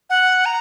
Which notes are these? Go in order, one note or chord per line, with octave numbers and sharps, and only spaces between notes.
F#5
A#5